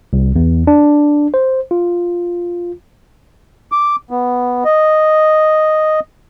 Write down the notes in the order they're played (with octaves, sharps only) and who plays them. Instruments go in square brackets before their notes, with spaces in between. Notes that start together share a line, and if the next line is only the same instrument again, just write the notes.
[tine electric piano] C2
E2
D4
C5
F4
[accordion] D6
B3
D#5